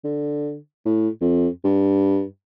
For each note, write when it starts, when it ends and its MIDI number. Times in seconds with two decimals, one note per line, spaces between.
0.04 0.57 50
0.85 1.08 45
1.21 1.48 41
1.64 2.24 43